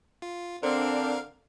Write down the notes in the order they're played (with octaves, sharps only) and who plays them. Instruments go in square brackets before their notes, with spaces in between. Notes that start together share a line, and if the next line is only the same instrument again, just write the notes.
[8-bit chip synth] F4
[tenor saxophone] D3 [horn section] C4 D4 [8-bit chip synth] A#4 F5